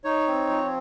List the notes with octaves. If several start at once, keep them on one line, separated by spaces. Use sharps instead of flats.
D#4 C#5
C4
F3